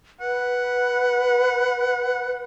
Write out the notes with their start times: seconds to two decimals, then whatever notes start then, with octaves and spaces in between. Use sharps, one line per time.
0.21 B4 F#5